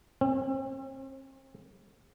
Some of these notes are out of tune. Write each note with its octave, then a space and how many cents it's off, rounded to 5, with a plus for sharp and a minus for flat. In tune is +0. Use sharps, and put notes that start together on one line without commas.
C4 +45